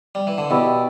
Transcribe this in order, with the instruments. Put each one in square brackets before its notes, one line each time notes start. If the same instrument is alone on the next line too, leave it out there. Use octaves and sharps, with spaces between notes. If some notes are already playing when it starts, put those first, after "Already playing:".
[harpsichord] G3
E3
D3
[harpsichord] B2 [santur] E4 G4 D5